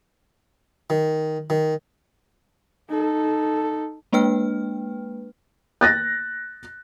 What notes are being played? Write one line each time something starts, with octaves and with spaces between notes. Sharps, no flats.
D#3
D#3
D#4 A4
G#3 A#3 D4 B4 G5 F6
F#6 A6 A#6